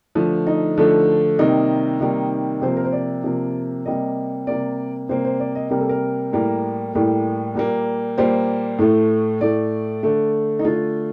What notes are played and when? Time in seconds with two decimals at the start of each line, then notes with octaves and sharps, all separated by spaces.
0.15 D3 F3 A3
0.47 D#4
0.78 D3 F3 A3
1.39 C3 D#3 G3 A#3 D#4
2.00 C3 D#3 G3 A#3
2.62 C3 F3 A#3 C5
2.77 A#4
2.84 C5
2.93 D5
3.24 C3 F3 A#3
3.86 C3 G3 A#3 D#5
4.47 C3 G3 A#3 D5
5.09 C3 G3 A#3 C5
5.25 C5
5.40 D5
5.55 D#5
5.70 C3 G3 A#3 A#4
5.80 A4
5.89 A#4
6.33 A2 G3 A#3
6.94 A2 G3 A#3
7.55 A#2 G3 A#3
8.18 A#2 G3 A#3 C5
8.79 A2 A3
9.41 A2 A3 D5
10.03 D3 A3
10.59 D#4
10.64 D3 A3 F4